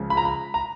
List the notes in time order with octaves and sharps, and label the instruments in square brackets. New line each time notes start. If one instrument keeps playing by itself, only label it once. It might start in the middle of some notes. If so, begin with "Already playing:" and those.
Already playing: [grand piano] C#2 C#3 F3
B5
A#5
B5
A#5